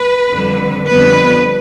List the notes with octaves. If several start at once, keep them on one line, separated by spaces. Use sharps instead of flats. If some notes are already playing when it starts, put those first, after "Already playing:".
Already playing: B4
F2 D3 G3
F2 D3 G3 B3 B4